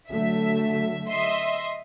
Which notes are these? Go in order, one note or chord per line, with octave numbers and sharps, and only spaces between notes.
D3 F#3 A3 E5
D#5 E5 C6